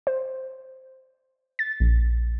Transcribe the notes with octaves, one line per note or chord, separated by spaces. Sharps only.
C5
A6
A#1